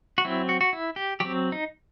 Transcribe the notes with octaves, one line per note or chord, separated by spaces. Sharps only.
F#4
F#3 C4 E4
F#4
F#4
E4
G4
F#3 C4 G4
D#4